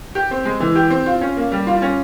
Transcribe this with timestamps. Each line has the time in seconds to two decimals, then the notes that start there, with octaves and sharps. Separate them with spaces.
0.15 G4
0.31 C4
0.45 G#3
0.60 E3
0.75 G4
0.90 C4
1.06 F4
1.21 C#4
1.37 A#3
1.52 G3
1.67 F4
1.82 C#4